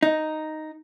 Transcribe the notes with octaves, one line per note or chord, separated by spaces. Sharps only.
D#4